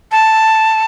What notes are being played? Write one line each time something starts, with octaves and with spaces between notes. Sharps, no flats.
A5